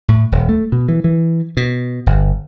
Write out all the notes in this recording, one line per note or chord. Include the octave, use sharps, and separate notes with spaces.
A2
D#1
A3
B2
E3
E3
B2
G1